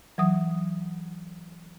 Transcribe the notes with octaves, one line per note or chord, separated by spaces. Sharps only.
E3 F#3 D#6